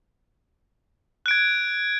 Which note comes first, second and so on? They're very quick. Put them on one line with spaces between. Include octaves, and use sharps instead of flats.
F#6 D7 G#6